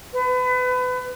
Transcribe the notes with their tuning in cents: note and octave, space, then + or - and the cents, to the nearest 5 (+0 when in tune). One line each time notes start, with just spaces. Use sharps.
B4 +30